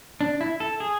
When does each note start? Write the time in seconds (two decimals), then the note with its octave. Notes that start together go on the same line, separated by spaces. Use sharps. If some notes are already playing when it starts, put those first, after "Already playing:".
0.21 D4
0.41 E4
0.60 A4
0.80 G#4